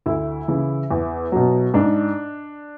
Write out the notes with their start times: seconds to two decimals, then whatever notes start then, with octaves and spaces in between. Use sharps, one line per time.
0.06 D2 E4
0.48 C#3 E3
0.91 E2
1.32 B2 F#3
1.74 G#2 D4